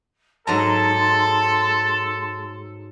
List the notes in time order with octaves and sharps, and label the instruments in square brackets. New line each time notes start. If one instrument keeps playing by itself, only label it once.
[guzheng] G#2 F#3 A#5 [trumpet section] A4 [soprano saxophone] A5 [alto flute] C6